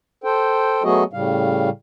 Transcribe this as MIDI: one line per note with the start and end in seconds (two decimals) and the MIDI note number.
0.24 0.83 69
0.24 0.83 72
0.24 0.83 79
0.84 1.04 54
0.84 1.04 57
0.84 1.04 59
0.84 1.04 66
0.84 1.04 68
0.84 1.04 75
1.13 1.70 45
1.13 1.70 49
1.13 1.70 55
1.13 1.70 77